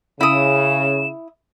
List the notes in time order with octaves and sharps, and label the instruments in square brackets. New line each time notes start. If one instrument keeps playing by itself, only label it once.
[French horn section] C#3 [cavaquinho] E4 D#6 [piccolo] E7